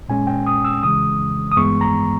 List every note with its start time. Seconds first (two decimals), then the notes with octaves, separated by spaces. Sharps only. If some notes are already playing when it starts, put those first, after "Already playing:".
0.08 A#2 G#3 C#4 G#5
0.27 G5
0.46 D#6
0.65 E6
0.82 C#2 C#3 E3 G#3 D#6
1.52 D#6
1.57 G2 E3 G#3 B3 C#6
1.81 A#5